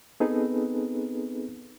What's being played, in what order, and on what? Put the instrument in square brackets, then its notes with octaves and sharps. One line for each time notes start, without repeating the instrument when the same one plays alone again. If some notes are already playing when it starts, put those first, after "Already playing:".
[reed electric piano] B3 C4 D#4 G#4 A4 B4